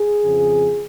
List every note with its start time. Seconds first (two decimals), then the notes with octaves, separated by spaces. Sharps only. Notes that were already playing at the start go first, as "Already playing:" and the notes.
Already playing: G#4
0.23 F2 C#3 F3